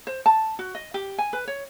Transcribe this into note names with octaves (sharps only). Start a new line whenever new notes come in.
C5
A5
F#4
D#5
G4
G#5
B4
C#5